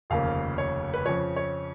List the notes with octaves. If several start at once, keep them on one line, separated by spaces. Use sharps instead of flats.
F1 D#2 C#3 F3 A#3 F5
C#5
B4
F2 C#3 F3 C#5
C#5